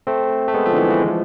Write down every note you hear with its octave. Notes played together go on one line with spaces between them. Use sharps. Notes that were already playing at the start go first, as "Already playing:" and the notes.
A3 C4
A3
G#3 B3
F3 A3
D3
E3
E3
G#3
F3